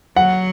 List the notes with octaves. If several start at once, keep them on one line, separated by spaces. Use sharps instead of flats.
F#3 F#5